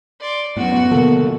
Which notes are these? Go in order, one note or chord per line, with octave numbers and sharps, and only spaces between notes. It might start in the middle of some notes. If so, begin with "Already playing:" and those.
D5 C6
F#2 A2 B3 F#4 F#5
B2 D3 F3 A#3 A4